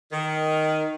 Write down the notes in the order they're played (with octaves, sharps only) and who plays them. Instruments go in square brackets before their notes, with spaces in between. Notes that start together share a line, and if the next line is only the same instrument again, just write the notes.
[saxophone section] D#3